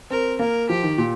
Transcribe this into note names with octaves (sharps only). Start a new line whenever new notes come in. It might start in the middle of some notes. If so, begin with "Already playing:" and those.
C4 A#4
A#3 A#4
F3 G4
D#3
A#2